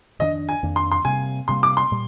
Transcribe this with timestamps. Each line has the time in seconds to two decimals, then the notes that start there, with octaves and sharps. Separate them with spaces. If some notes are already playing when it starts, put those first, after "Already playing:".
0.19 F2 D#3 A#3 D4 D#5
0.49 G#5
0.63 F2 D#3 A#3 D4
0.76 C6
0.92 C6
1.05 C3 G3 A#3 G#5
1.48 C3 G3 A#3 C6
1.63 D6
1.77 C6
1.91 A#2 G3